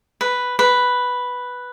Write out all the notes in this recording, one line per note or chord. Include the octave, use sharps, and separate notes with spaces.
B4
B4